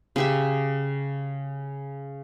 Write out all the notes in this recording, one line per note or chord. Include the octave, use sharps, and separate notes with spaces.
C#3 G4 E5